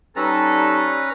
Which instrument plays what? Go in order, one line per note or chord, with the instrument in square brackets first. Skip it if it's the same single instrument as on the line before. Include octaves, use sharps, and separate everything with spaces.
[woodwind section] G3 D#4 A4 [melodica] C#4 B4 A#5